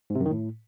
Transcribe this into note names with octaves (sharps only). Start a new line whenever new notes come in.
G#2
C3
F#2
D#3
A2